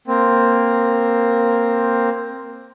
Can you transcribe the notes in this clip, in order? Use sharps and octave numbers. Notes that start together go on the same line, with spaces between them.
A#3 C4